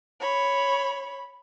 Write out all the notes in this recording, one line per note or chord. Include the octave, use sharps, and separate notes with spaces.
C#5 B5